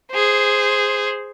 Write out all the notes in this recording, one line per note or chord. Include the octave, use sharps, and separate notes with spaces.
G#4 C5